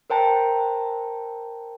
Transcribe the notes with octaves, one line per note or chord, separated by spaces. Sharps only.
A#4 C5 G5 A5 A#5